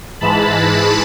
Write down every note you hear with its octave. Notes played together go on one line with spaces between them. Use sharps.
G#2 E3 G#3 A5 B5